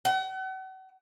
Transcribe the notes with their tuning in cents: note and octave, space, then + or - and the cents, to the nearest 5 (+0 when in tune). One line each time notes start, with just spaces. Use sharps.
F#5 +40